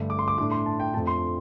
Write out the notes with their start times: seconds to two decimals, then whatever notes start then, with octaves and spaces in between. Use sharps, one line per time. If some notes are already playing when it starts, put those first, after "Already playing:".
Already playing: G2 D3 A3
0.10 D6
0.19 C6
0.28 D6
0.38 A2 A3 D4 D6
0.52 C6
0.66 A5
0.80 G5
0.94 F2 F3 A3 D4 A5
1.07 C6